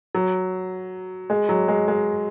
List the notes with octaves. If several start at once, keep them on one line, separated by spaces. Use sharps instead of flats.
F#3
G#3
F#3
G#3
G#3